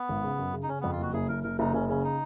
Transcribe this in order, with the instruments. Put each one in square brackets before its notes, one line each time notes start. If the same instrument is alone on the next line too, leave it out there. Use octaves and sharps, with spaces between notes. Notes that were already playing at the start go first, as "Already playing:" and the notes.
Already playing: [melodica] B3
[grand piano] G#1
C#3
F#2
C#3
[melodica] D#4
[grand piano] C#3 [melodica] C#4
[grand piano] F2 [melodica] B3
[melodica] F4
[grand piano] F#1 [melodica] F#4
[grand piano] F#1 [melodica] G#4
[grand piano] F#1 [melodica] A#4
[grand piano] F#1 [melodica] A#4
[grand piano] F#1 [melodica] D#4
[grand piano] F#1 [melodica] C#4
[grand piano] C#3 [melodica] C#4
[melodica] D#4